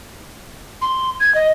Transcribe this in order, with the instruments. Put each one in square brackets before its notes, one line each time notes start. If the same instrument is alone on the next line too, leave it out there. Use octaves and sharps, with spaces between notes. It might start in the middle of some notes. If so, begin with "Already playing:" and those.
[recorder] C6
G#6
D#5